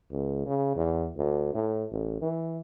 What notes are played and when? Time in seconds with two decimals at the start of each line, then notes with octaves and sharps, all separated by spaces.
0.11 C#2
0.46 C#3
0.76 E2
1.17 D2
1.55 A2
1.91 A1
2.22 E3